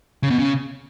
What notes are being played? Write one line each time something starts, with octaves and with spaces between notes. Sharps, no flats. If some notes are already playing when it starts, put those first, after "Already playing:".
C#3
B2
C#3